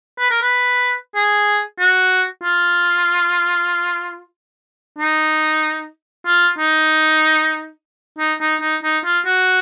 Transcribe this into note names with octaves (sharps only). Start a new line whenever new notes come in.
B4
A#4
B4
G#4
F#4
F4
D#4
F4
D#4
D#4
D#4
D#4
D#4
F4
F#4